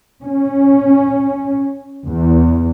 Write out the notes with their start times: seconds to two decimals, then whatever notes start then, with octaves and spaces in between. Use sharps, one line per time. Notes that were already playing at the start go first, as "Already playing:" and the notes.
0.24 C#4
2.08 E2